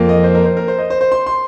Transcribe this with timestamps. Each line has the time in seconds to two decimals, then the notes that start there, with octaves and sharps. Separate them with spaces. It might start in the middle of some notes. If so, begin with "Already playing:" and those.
Already playing: F2 F3 A#3
0.09 D#5
0.24 C5
0.35 A#4
0.45 C5
0.57 A#4
0.68 C5
0.78 D#5
0.90 C5
1.01 C5
1.12 C6
1.26 C6